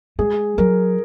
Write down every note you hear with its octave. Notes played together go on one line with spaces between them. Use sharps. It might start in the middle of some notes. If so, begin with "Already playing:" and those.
G#3 G#4
F#3 A#4